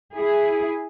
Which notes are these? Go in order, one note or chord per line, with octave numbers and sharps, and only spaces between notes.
E4 G#4